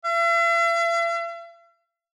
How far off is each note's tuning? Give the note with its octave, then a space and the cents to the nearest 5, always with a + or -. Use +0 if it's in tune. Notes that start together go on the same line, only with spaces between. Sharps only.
E5 +45